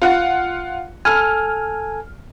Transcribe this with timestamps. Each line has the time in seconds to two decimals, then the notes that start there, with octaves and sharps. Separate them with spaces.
0.02 F4 F#5
1.05 A4 G#5 F6